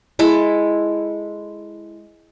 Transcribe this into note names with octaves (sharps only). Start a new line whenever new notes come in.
G#3 E4 A4